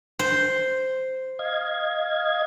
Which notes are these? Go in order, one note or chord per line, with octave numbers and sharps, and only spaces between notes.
C5
D#5 F5 G#6